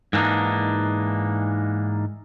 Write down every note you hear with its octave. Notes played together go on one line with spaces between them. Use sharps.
G#2 E3 A#3 D4 D#4